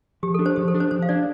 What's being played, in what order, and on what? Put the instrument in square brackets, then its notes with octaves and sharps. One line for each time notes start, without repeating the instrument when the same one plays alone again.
[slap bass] F3 [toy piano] G4
[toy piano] A4
[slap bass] D4
[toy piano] C5
[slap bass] F3 [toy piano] G4
[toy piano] A4
[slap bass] D4
[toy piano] C5
[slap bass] F3 [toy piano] C5
[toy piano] F5
[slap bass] D4 [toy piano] D5